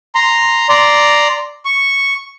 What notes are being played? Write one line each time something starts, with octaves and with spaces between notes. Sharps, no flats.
A#5 C6
D5 A#5 C6
C#6